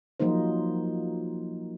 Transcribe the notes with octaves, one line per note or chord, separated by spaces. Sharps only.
F3 F#3 A#3 D#4 C5